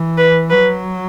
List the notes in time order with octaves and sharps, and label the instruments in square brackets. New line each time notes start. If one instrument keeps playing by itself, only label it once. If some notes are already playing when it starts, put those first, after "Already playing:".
Already playing: [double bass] E3
[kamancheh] B4
[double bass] F#3 [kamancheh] B4